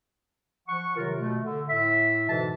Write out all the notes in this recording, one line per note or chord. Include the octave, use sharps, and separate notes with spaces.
F3 F#5 C#6
C3 D#3 F#3 F4 A#4
B2 A3
D3
A2 E5
G#2 B2 D3 E3 G#3 A5